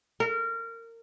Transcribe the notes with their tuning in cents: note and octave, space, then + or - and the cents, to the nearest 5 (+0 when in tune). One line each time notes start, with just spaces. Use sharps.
A#4 -25